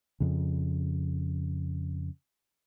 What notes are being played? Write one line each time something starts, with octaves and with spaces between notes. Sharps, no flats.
F2 C#3